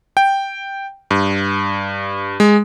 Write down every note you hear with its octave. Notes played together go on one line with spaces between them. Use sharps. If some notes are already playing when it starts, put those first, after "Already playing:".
G5
G2
G#3